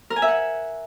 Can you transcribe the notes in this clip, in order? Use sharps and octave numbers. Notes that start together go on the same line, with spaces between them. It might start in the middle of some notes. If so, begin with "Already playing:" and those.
A#4
G#5
E5
F#5